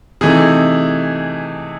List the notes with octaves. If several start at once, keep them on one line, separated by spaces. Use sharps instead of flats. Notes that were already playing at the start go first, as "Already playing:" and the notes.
C3 E3 A3 D#4 G#4